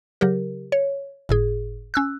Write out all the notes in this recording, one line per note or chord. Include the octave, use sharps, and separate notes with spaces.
C#3 F#3 G4 A#4
C#5
G1 A2 G#4
C#4 E6 F#6